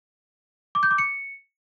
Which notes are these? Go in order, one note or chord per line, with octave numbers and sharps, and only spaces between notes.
D6
G6
D6
C#7